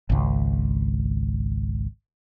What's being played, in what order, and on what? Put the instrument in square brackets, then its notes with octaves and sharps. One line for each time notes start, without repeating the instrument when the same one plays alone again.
[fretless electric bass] G#1 C#2